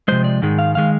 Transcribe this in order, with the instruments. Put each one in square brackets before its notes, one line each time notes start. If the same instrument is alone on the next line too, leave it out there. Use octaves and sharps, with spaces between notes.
[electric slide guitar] C3 F3 G#3 C5
D5
G#2 D#3 G#3
F5
D#3 G#3 F5